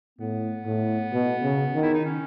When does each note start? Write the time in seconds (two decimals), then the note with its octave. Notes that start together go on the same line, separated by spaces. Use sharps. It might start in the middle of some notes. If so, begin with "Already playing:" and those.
0.19 A2 B3
0.66 A2
1.13 B2
1.43 C#3
1.75 D#3
1.82 E4
1.94 D#4
2.05 C#4